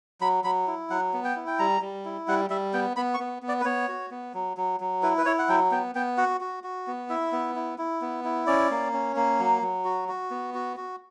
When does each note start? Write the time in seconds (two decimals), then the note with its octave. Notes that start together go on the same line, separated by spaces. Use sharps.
0.21 F#3 B5
0.44 F#3 B5
0.67 E4
0.90 F#3 F#5
1.14 B3
1.24 G5
1.36 E4
1.47 G5
1.59 G3 A#5
1.81 G3
2.05 E4
2.28 G3 F#5
2.50 G3 E5
2.73 B3 G5
2.96 B3 B5
3.14 C#6
3.20 B3
3.43 B3
3.48 D5
3.61 B4
3.65 B3 C#5
3.88 F#4
4.11 B3
4.34 F#3
4.57 F#3
4.80 F#3
5.03 E4 B4
5.18 B4
5.25 E4 C#5
5.39 F#5
5.49 F#3 G5
5.71 B3 G5
5.95 B3 G5
6.18 F#4 F#5
6.41 F#4
6.64 F#4
6.87 B3
7.09 E4 E5
7.32 B3
7.56 E4
7.78 E4
8.01 B3
8.24 E4
8.47 C#4 D5
8.71 A#3
8.93 C#4
9.16 A#3
9.39 F#3
9.62 F#3
9.85 F#4
10.08 F#4
10.31 B3
10.54 F#4
10.77 F#4